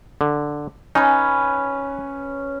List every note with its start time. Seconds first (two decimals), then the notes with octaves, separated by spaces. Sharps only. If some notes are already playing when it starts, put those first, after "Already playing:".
0.21 D3
0.95 C#4 D#4 B4